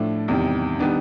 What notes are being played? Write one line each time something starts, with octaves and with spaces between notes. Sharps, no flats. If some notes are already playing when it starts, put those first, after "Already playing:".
Already playing: A2 F3 A3 D4
E2 C3 D#3 G3
D#3 G3 B3 D4